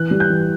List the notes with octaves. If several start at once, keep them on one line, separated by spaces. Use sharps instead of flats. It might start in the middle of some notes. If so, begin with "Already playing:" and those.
Already playing: E3 F#6
G3
G6
E3